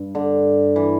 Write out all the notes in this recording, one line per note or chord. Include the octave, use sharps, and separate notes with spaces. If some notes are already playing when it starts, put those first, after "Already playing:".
Already playing: G2
D3
E3